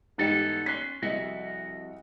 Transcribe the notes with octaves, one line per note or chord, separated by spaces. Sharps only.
G#2 E3 G3 B3 D#4 A4
C#4 C6 F#6 B6
C2 F2 F#4 D#5 E5